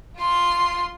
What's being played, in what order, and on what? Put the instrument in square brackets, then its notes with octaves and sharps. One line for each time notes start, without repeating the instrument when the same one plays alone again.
[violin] F4 C6